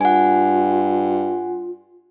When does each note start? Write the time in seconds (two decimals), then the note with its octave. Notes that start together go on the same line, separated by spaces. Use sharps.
0.01 G2 F4 F#5 G#5